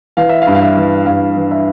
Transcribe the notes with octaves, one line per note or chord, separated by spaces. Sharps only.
E3 F5
E5
F5
G2
F5
E5
E3
G2 F5
E3
E5